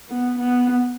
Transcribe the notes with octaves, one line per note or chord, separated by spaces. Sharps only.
B3
B3